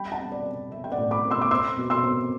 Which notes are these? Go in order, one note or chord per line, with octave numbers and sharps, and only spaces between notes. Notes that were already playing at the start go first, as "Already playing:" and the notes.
Already playing: G3 G5 B5
F#5 A5
C4
D5
C4
C4 E5
G5
D5 F#5
A2
B5 D6
C4
C6 E6
D6
C4 C6 E6
B2
C6 E6
C4